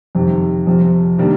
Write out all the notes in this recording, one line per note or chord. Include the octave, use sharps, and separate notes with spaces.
F2 C3 D#3
F2 C3 F3
C3 D#3 G3 A#3 D4